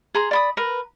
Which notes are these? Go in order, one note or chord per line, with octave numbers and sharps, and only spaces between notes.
G#4 A#5 C6
D5 B5 D#6
A#4 B4